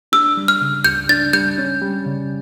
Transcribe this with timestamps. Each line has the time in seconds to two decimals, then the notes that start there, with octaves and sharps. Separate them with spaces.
0.12 D4 E6
0.37 G3
0.48 F6
0.61 C#3
0.84 C#2 G6
1.09 D4 A6
1.33 G3 G6
1.58 C#4
1.81 G3
2.06 C#3